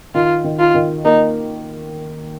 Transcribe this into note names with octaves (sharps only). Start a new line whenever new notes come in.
D#3 F4
D#3
F4
D#3
A#3 D#4